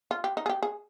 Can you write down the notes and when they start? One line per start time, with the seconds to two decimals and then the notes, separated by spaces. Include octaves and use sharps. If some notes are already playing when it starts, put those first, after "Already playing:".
0.11 F4
0.24 G4
0.37 D#4
0.46 G#4
0.49 G4
0.62 G#4